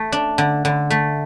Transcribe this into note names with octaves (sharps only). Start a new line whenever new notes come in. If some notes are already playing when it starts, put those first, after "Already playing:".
Already playing: A3
D4
D3
D3
A3